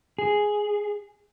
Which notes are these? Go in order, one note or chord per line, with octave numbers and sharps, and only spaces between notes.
G#4